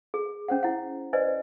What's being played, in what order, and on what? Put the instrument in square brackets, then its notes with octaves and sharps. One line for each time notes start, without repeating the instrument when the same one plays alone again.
[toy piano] G#4
C#4 C5 F#5
E4 F#5
B4 C5 D5 D#5 G#5